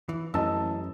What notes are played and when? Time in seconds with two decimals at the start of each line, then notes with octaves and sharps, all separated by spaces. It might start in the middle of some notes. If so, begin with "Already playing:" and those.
0.09 E3
0.34 A1 F#2 D#5 A5 E6